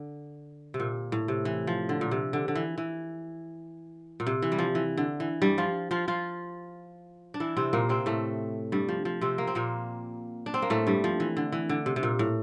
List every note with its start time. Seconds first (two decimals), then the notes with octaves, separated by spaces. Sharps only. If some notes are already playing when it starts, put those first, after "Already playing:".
Already playing: D3
0.74 C3
0.80 A#2
1.12 A2
1.28 C3
1.45 E3
1.67 F3
1.89 D3
2.01 A#2
2.11 C3
2.33 D3
2.48 D3
2.55 E3
2.78 E3
4.20 A#2
4.27 C3
4.42 E3
4.52 G3
4.59 F3
4.75 E3
4.98 D3
5.20 E3
5.42 G2 G3
5.58 F3 F4
5.91 F3 F4
6.08 F3 F4
7.34 D4
7.40 E3 E4
7.57 C3 C4
7.73 A#2 A#3
7.89 C3 C4
8.06 A2 A3
8.72 G2 G3
8.89 F3
9.05 F3
9.21 C3 C4
9.38 A#3
9.47 C4
9.55 A#2 A#3
10.46 D4
10.54 C4
10.62 A#3
10.70 A2 A3
10.87 G2 G3
11.04 F3
11.20 E3
11.37 D3
11.52 E3
11.69 D3
11.86 C3
11.96 C3
12.03 A#2
12.19 A2